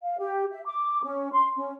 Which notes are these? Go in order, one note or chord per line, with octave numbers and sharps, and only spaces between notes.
F5
G4
E5
D6
C#4
C6
C#4